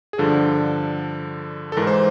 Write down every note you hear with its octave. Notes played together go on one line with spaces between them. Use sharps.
G#4
G2 D3 F3 A4
A4
G#2 E3 A#4
C5